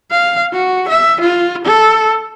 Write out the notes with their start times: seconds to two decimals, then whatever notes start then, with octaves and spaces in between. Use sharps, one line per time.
0.11 F5
0.52 F#4
0.89 E5
1.21 F4
1.65 A4